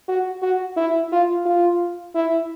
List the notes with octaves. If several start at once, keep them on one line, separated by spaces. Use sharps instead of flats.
F#4
F#4
E4
F4
F4
E4